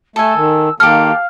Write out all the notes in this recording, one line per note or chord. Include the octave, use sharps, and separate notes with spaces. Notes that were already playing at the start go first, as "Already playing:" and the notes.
A3 A4 G#5 E6
D#3
D#3 A#3 G4 A4 F5 F6